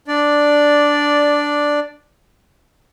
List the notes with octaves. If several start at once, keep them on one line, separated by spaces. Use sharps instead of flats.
D4 D5